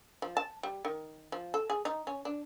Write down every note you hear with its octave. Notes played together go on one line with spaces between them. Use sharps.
F3
A5
G3
D#3
F3
A4
G#4
D#4
C#4
D4